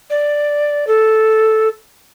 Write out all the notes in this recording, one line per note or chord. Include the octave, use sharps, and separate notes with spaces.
D5
A4